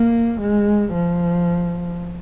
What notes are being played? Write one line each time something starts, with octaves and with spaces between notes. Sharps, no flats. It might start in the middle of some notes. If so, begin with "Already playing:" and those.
Already playing: A#3
G#3
F3